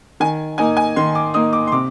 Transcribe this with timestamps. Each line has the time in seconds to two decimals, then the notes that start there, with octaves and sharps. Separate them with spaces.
0.20 D#3 G#5
0.58 A#3 D#4 G#5
0.77 G#5
0.96 D#3 C6
1.15 D6
1.34 A#3 D#4 D#6
1.53 D6
1.67 C6
1.72 C3 D6